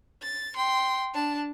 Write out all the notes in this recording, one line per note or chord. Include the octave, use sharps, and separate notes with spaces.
A6
G5 C6
D4 A5